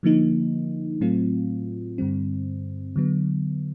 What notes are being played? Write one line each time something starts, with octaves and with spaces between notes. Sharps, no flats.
D3 F3 A#3 D#4
A2 F#3 A3 C4 F4
G2 D3 G3 C4
D3 F#3 B3